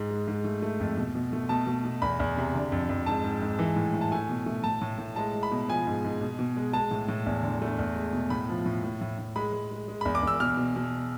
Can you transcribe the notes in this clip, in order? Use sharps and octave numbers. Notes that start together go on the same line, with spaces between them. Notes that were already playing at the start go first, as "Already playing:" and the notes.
Already playing: G#2
G#3
G#2
A3
A3
F2
B2
B2
A3
B2 A5
B2
B2
E2 B5
E2
C3
D3
F2
F2
G#2 A5
G#2
G#2
E3
A2
A2
A5
A3 G#5
B2
A3
A2 A5
A2
A2
G#3 A5
G#3
B5
B2
F3 G#5
G#2
G#2
B2
B2
G#3
G#3 A5
A2
A2
E2
D3
A3
E2
G#3
B2
A2 B5
F3
A2
A2
A2
A2
G#3 B5
G#3
G#3
G#3
B5
E2
D6
E2 E6
B2 F6
B2
B2